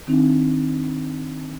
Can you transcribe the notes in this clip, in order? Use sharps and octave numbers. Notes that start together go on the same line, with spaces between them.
D#3 C4 D4 D#4